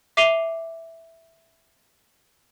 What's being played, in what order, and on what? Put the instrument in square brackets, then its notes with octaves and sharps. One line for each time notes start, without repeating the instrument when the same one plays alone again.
[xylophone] E5 D6 C7 D#7 F7 G7